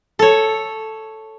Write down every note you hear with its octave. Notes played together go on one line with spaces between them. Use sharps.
A4 C#5